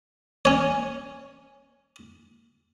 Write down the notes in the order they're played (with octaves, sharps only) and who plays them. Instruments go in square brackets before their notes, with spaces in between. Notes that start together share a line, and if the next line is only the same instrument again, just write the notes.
[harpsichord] C#4 C#5